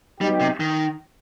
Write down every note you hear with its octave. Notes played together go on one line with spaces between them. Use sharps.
F#3 G3 B3 D#4 G4
C3
D#3